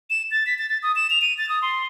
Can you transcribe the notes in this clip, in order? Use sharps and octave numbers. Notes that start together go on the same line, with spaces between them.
E7
A6
B6
A6
A6
D#6
E7
F7
D#7
A6
D#6
C6